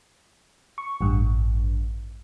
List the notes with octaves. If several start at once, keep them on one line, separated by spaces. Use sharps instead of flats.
C#6
A1 G2